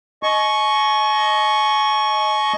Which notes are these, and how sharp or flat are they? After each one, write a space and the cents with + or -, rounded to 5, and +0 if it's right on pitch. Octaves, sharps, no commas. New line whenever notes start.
D#5 +0 G#5 +45 C#6 +0